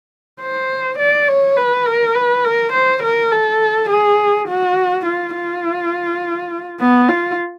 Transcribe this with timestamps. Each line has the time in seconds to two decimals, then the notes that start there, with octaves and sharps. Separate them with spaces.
0.41 C5
0.99 D5
1.28 C#5
1.57 B4
1.86 A#4
2.15 B4
2.45 A#4
2.73 C5
3.03 A#4
3.32 A4
3.90 G#4
4.48 F#4
5.06 F4
5.35 F4
6.80 B3
7.09 F4